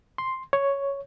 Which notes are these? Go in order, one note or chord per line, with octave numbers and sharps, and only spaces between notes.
C6
C#5